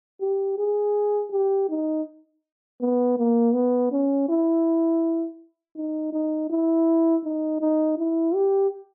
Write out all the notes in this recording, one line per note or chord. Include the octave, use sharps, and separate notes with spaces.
G4
G#4
G4
D#4
B3
A#3
B3
C#4
E4
D#4
D#4
E4
D#4
D#4
E4
G4